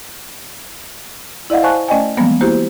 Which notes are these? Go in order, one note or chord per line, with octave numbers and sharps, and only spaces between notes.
E4 D5 D#5 F5 F#5
C5 F5 G#5 A5 C#6 F#6
A3 C#4 D5 D#5 G5 G#5
E3 F3 G3 G#3 A#3 B3
A#3 E4 F#4 G4 C5